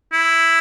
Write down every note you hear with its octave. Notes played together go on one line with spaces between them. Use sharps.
E4